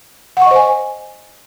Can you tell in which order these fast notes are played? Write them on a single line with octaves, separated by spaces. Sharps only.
F#5 C#6 D#5 C5 G#5